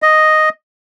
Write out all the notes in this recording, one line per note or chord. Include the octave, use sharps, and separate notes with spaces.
D#5